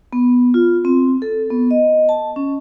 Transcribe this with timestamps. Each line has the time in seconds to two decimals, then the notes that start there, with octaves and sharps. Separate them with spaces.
0.13 B3
0.54 F4
0.85 C4
1.22 A4
1.50 B3
1.71 D#5
2.09 A5
2.36 C#4